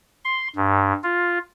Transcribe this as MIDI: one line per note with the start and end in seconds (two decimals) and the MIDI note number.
0.25 0.48 84
0.56 0.93 43
1.04 1.39 65